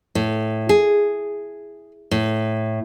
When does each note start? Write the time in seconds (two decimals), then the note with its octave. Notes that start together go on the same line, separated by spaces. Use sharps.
0.15 A2
0.69 G#4
2.11 A2